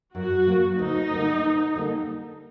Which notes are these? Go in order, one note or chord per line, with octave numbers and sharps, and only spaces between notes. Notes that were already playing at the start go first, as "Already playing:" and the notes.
F#2 F#4
F#3 A#3
D2 D#4
D3 G3 A#3
D2
D3 G3 A#3